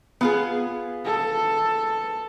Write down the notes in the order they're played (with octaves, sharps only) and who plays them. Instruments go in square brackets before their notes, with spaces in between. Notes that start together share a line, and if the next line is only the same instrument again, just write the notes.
[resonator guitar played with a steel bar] B3 F4 G#4
[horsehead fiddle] A4